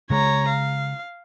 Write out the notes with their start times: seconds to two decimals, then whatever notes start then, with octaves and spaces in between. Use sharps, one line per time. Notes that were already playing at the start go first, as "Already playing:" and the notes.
0.10 C#3 G#3 C#5 A#5
0.48 F5